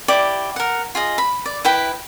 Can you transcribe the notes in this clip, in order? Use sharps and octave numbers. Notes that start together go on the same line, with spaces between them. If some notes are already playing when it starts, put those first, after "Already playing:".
E4 G4 D5 D6
A#4 F#5
F4 G#4 D#5
B5
D5
E4 B4 G5 B5